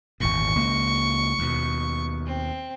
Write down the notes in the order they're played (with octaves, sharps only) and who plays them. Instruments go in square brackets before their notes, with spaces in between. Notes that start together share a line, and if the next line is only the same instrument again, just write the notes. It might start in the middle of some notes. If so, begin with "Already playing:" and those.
[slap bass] G#1 E2 A#2 [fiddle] C#6
[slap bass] C#2 A#3
D#2 B2
[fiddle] C4